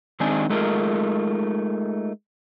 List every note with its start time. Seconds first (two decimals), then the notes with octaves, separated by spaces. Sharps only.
0.20 D#3 G#3 C4 D4 D#4 G#5
0.50 G#3 A3 D#4 F4 G#4 A#4